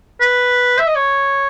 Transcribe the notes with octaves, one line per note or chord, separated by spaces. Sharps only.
B4
E5
D#5
C#5